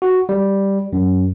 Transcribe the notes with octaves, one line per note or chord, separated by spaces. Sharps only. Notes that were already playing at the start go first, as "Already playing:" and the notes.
F#4
G3
F#2